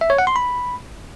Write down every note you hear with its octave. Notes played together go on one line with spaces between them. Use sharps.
E5
C#5
F#5
C6
B5